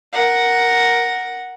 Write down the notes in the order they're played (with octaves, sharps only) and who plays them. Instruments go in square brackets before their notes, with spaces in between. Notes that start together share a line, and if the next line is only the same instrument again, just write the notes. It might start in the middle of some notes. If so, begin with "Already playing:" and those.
[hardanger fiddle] A#4 F#5